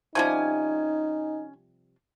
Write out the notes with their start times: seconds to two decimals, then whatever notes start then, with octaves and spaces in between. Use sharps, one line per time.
0.15 C3 F3 G3 C#4 D#4 G#5